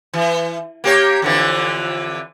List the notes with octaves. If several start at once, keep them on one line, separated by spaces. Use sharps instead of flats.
E3
A#3 G4 C#5
F2 D3 E3